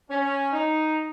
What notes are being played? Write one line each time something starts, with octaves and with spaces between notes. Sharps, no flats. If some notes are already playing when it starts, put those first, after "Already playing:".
C#4
D#4